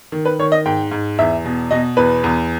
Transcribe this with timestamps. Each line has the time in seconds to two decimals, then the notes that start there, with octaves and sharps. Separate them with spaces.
0.12 D#3
0.25 B4
0.39 D#3 C#5
0.52 D#5
0.65 G#2 G5
0.91 G#2
1.18 E2 E5
1.45 B2
1.71 B2 D#5
1.97 E2 B4
2.24 E2